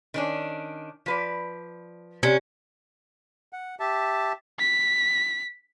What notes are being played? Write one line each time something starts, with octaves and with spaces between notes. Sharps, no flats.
D#3 C#4 D4
F3 B4 D5
C3 C#4 G4 D5 G5
F#5
G4 E5 A5
B6